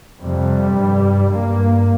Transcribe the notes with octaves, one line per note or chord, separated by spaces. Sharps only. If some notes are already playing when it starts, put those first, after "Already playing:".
F2 C3 G3
G2
G2 A#3